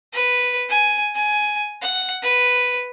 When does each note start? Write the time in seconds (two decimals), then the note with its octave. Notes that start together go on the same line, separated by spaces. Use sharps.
0.13 B4
0.69 G#5
1.15 G#5
1.82 F#5
2.23 B4